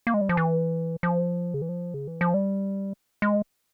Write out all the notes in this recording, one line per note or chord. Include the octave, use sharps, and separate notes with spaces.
A#3
G#3
G3
F3
E3
F3
C#3
E3
F3
C#3
E3
F3
G3
G#3